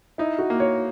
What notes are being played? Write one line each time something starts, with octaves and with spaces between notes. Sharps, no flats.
D#4 E4
F#4
A#3
C#5